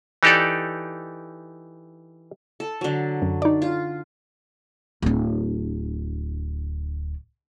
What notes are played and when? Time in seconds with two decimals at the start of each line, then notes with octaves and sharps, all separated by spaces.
0.23 E3 D#4 G4 A4 D5
2.60 A4
2.81 D3 F#3
3.22 F#2
3.42 D#4 D5
3.62 F4
5.02 D1 D4